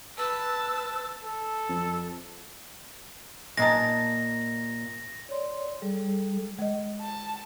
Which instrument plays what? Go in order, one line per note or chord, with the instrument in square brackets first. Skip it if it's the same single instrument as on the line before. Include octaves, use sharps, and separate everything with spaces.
[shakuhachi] B4 [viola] A5 [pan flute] E6
[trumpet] A4
[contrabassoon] F2
[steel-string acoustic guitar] A#2 A#3 [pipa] G#3 D#4 A5 [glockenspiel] A#6
[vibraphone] C#5 D5 C6
G3 G#4 A4
[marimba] G#3 D#5
[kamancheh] A5